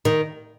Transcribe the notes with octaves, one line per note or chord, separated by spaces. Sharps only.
D#3